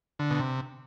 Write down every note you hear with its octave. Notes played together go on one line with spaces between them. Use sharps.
D3
B2
C3